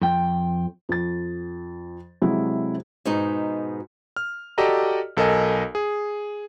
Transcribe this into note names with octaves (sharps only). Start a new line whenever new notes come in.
F2 G5
F2 A6
C3 F#3 G#3 E4
G#2 B2 D#4
F6
F#4 G4 A4 D5 D#5 A#5
B1 A4 A#4 D#5 G#5
G#4